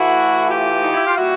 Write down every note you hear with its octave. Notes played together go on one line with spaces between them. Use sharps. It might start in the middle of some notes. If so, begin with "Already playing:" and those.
Already playing: A2 E3 A3 E4 F#4
F4 G4
D#4
E4
F4
A#2 G3 E4 F#4